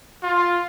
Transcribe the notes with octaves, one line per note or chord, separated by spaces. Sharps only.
F4